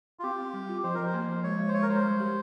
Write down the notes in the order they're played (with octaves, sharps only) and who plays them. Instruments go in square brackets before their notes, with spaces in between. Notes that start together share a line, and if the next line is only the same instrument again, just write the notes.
[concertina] F4
[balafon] C4 [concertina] G4
[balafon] C4
G3
F4
[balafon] F3 [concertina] C5
[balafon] F3 [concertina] A#4
[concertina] C5
[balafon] A#3
F3
[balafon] G#3 [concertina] C#5
[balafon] G#3
[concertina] C5
[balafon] G#3 [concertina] C#5
[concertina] A#4
[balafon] G#3 [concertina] C5
[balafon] G3
G4